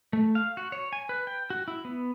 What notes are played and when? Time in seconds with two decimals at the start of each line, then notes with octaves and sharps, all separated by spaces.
0.13 A3
0.35 F5
0.57 F#4
0.72 C#5
0.93 G#5
1.09 B4
1.27 G5
1.50 F#4
1.68 E4
1.85 B3